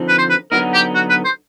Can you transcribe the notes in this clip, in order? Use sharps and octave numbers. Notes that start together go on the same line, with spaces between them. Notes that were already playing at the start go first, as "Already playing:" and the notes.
Already playing: D3 F3 C4 D#4
B4
C5
B4
D3 F#3 B3 D#4 A#4
G4
F#4
B4
C5